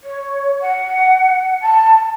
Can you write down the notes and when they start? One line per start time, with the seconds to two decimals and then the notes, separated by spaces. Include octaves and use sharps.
0.03 C#5
0.60 F#5
1.61 A5